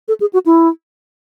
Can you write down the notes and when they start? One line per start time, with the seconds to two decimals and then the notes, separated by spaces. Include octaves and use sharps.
0.08 A4
0.20 G#4
0.33 F#4
0.46 E4